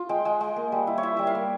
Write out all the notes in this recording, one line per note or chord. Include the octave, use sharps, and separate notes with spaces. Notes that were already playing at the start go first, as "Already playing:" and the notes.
Already playing: F4
G#3 G5
G#3
G#3
A#3
G3
E4
C#5
E4 E5
G3 E5
F5
A#3